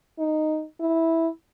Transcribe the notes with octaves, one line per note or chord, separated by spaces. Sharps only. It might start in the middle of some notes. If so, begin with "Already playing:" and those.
D#4
E4